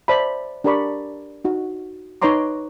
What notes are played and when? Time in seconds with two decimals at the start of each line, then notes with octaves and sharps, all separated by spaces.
0.08 C5 D5 E5 A5 B5
0.64 D4 G4 A#4 D5 B5 C#6
1.45 D#4 F#4
2.22 D#4 B4 C#5 A#5 C6 D6